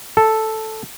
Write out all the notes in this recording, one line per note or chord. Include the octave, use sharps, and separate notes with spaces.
A4